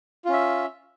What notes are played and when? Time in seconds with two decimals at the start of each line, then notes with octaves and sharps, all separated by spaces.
0.25 F4
0.29 C#4
0.33 E5